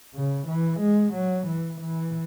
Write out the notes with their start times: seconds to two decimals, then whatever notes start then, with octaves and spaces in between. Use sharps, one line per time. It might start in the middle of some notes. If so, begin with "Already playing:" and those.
0.15 C#3
0.48 E3
0.80 G#3
1.14 F#3
1.47 E3
1.81 E3